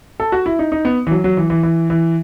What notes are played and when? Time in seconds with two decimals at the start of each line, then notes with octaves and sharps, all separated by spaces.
0.20 A4
0.32 F#4
0.46 E4
0.59 D#4
0.72 D#4
0.85 B3
1.07 E3
1.11 F#3
1.24 F#3
1.37 E3
1.50 E3
1.63 E3
1.90 E3